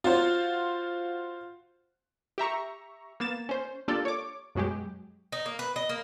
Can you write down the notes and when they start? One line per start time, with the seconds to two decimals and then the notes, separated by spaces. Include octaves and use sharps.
0.04 F4 F#4 C5
2.38 G4 E5 A#5 C#6
3.20 A#3 B3 A6 E7
3.49 C#4 C5
3.88 A#3 D4 F4 G4 A4 D5
4.05 C#5 D6
4.55 F#2 B2 F#3 G#3 G4
5.32 D#4
5.46 A#3
5.59 B4
5.76 D#5
5.89 A#3